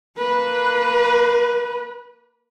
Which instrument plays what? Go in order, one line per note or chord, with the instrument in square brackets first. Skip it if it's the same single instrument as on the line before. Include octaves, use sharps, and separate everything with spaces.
[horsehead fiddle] A#3 B4